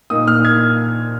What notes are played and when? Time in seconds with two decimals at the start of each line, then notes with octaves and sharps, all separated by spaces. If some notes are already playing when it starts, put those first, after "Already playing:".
0.10 A#2 A#3 D#4 D#6
0.28 F6
0.45 G#6